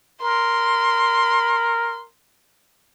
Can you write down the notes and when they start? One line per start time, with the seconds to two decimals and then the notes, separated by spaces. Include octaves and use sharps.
0.22 A#4 C6